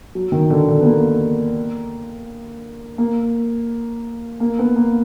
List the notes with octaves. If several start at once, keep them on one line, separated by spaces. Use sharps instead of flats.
F#3
D#3
D3
D3
B3
A#3
A#3
A#3
B3
A#3